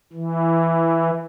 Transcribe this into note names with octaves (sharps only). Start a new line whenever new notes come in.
E3